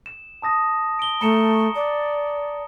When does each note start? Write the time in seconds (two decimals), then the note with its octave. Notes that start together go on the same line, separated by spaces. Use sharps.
0.06 E7
0.42 A5 D#6 A#6
0.99 D7 G7
1.21 A3 A#5 C#7 E7
1.75 D5